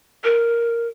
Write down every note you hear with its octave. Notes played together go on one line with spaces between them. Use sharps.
A#4